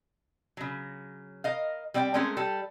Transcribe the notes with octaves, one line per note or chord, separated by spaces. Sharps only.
C#3 F#3
A#4 D#5 F5
G3 C4 D5 E5 G5
G#3 A3 C4 C#4 G#4 A#4
G3 A4